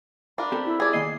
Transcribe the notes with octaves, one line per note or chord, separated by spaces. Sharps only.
D4 F4 A#4 B5
C4 G4 A4
E4
G#4 D5 G#6
D#3 A#3 D#5 C7